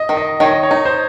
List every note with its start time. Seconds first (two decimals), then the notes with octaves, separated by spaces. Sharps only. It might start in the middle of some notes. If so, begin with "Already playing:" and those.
Already playing: D#5
0.09 D#3
0.17 D#5
0.40 D#3 C#5
0.52 D#5
0.63 C#5
0.71 D#4
0.85 C5